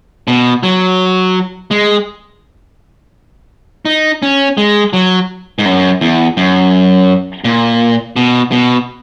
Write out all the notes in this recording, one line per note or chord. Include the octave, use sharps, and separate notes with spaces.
B2
F#3
G#3
D#4
C#4
G#3
F#3
G#2
F#2
E2
F#2
A#2
B2
B2